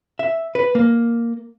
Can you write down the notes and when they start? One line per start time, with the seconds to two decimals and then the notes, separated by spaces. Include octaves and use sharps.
0.19 E5
0.55 B4
0.75 A#3